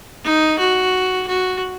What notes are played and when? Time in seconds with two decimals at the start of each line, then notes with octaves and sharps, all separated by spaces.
0.24 D#4
0.59 F#4
1.27 F#4